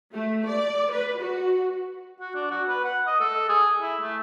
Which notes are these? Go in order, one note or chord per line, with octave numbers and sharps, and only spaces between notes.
A3
D5
B4
F#4
F#4
D4
F#4
B4
F#5
D#5
A4
G#4
E4
A3